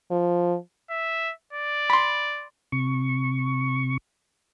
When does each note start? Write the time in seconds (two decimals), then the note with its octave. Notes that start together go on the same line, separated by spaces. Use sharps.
0.11 F3
0.90 E5
1.53 D5
1.90 B5 C6
2.72 C3 C#6